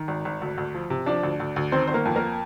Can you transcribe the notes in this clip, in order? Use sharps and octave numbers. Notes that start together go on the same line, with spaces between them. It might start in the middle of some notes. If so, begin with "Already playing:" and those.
Already playing: D#3
G#1
G#1
D2
D2
F3
C3
F3 D4 D5
D2
D2
D2
D#3 C4 C5
G1 C5
A#3 A#4
F2
A#3 A#4